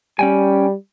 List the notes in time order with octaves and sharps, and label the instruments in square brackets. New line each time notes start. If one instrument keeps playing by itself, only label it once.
[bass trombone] G3 [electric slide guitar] C#4 G5 G#5